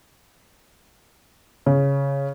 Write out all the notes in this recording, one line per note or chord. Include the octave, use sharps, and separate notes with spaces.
C#3